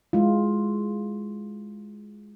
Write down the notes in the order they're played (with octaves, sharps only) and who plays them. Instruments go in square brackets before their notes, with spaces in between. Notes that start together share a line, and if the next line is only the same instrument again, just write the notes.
[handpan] G#3 E4 F4